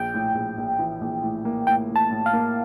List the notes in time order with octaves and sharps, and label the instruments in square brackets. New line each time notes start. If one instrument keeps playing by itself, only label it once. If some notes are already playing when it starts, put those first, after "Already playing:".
Already playing: [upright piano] A#1 [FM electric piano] G5
[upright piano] A2
A#1
A#1
E3
A#1
A2
A#3
[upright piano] A2 [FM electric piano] G5
[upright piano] A2
[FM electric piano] A5
[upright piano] A2
[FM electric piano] F5
[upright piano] A#3